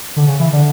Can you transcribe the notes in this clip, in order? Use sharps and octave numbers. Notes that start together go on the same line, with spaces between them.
D3
C#3
E3
D3